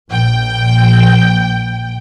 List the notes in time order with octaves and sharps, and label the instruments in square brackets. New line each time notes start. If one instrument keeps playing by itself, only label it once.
[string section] A#1 G5